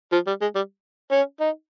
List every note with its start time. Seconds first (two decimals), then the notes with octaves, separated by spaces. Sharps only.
0.12 F3
0.27 G3
0.41 G#3
0.55 G3
1.12 C#4
1.41 D#4